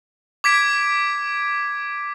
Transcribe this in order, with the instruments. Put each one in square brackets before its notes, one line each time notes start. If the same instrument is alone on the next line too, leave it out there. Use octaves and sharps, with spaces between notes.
[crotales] D6 G#6 B6 D7